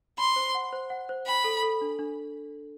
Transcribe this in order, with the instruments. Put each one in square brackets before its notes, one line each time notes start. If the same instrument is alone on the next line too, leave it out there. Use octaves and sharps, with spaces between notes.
[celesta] B5 [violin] C6
[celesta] C5
F#5
C5
F#5
C5
[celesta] G5 [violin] B5
[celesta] A4
A4
D4
D4